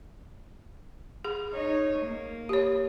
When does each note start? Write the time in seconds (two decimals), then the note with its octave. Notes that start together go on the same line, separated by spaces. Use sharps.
1.25 G#4
1.54 D#4 C#5
1.99 A#3
2.49 G4 C#5